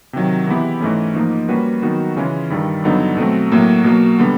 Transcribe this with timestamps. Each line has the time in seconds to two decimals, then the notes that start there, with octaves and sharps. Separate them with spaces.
0.13 C3 D#3 F#3
0.47 E3 G#3 B3 E4 G4
0.81 G#2 E3 A3 C#4
1.14 G#2 F3 A#3 D#4
1.49 G3 A#3 C#4 F#4 B4
1.82 D#3 F#3 B3 D#4 F#4
2.16 C#3 E3 G#3 C#4 F4
2.50 G2 D#3 G3
2.84 G2 D3 F#3 B3 D#4
3.17 B2 F#3 A3 C4
3.52 A2 F#3 A#3
3.84 B2 F#3 A#3
4.19 D3 G3 B3